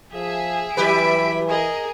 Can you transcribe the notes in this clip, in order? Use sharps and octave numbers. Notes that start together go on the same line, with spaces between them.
F3 G#4 E5
E3 F#3 G4 B4 E5 G#5 B5 D7
G#4 A#4 D#5